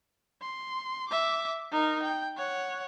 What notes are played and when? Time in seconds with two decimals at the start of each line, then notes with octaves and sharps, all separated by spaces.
0.42 C6
1.09 E5 D6
1.72 D#4 A#4
2.03 G5
2.37 C#5 F#5